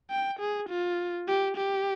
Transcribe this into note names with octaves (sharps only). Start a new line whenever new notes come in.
G5
G#4
F4
G4
G4